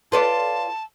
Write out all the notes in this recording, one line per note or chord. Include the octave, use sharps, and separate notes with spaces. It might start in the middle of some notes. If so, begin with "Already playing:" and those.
F4 B4 D5 A5